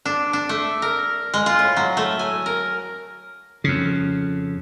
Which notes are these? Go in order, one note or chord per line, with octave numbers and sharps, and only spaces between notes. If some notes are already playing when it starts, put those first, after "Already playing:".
D4
D4
A3
A#4
G#3
F4
A2
F#3
A3
G#5
A#4
F2 C#3